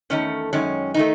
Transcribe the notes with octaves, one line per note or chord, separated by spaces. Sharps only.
E2 D#3 A3 C#4
F#2 D#3 G#3 C#4
D#3 A3 D#4